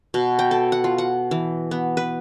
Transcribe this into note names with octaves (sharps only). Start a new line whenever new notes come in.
B2
G5
A4
F#5
F4
F#5
E3
B3
B4